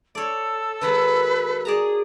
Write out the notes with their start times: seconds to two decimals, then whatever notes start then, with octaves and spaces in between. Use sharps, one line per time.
0.15 A4 C#5 D5
0.81 D#3 F#3 G#3 B4
1.65 G#4 D5 A5 A#5